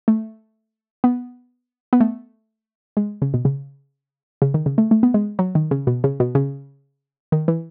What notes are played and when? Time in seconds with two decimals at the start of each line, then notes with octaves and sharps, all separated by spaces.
0.08 A3
1.04 B3
1.93 B3
2.01 A3
2.97 G#3
3.22 C#3
3.34 B2
3.45 C#3
4.42 C#3
4.54 D#3
4.66 C#3
4.78 A3
4.91 A3
5.03 B3
5.14 G#3
5.39 F#3
5.55 D#3
5.71 C#3
5.87 B2
6.04 C#3
6.20 B2
6.35 C#3
7.32 D#3
7.48 E3